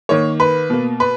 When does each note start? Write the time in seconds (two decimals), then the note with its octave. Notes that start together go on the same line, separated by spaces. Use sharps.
0.09 D#3 A#3 C#5
0.40 B4
0.70 B2 A#3
1.00 B4